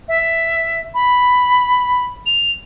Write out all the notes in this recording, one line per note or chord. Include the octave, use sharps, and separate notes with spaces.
E5
B5
F7